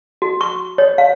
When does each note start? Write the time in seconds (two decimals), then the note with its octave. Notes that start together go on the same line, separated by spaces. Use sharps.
0.22 F#4
0.41 C#6
0.78 C#5
0.98 F5